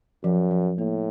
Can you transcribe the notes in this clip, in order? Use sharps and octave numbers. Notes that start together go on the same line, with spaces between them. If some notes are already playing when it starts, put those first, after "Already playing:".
F#2 F3
F3
A2 A#3